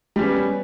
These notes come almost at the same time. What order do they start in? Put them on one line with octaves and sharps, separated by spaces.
G3 C#4 B3